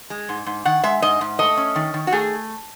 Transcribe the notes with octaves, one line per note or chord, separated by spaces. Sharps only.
G#3
G#2
G#2
D#3 F#5
G#3 E5
G#2 D#5
G#2
A3 D#5
C#4
D#3
D#3
F#4
A3 G#4